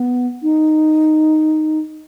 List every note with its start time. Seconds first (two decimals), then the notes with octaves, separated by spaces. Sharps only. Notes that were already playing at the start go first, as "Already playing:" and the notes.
Already playing: B3
0.43 D#4